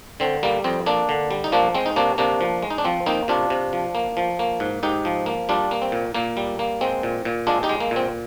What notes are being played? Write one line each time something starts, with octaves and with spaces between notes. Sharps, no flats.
D3 C4
G3 A#3
F2 C4
A#3 D4
D3
G3
D#4
F3 A#3 D4
G#3 C4
D#4
C3 A#3 D4
C3 A#3 D4
F3
G#3
D#4
D4
F3 C4
A#3 C4 D#4
C3 D4 F4
C3
F3
A#3
F3
A#3
G#2
G#2 D#4 G4
F3
A#3
G3 D4 F4
A#3
C4
A#2
A#2 A#3
G3
A#3
G#3 C4
A#2
A#2
G#3 D4 F4
D#4 G4
G#3
A#3
A#2 C4